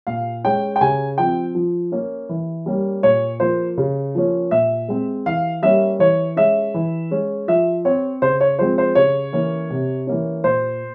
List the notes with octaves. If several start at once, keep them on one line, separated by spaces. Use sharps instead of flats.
A#2 F5
G#3 C#4 G5
G5
C#3 G#5
F3 C4 G5
F3
A#3 C#4
E3
G3 A#3 C#4
A#2 C#5
F3 A#3 C5
C#3
F3 A#3 C#4
A#2 E5
G#3 C4
E3 F5
G3 A#3 C#4 E5
E3 C#5
G#3 C#4 E5
E3
G#3 C#4
F3 E5
C4 C#5
C#3 C5
C#5
F3 G#3 C4 C5
C5
C#3 C#5
E3 A#3 C#4
C3
E3 A#3 C#4
A#2 C5